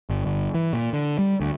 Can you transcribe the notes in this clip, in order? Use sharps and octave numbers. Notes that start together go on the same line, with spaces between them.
G1
G1
E3
A#2
D3
G3
D2